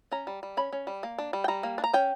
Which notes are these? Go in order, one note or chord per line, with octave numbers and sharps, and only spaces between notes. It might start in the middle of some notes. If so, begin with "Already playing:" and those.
C#4 A#5
G3
G3
C#4 B5
C#4
G3
A#3
D4
G3
G5
G3 A#5
A#3
D4
A#5
C#4 G5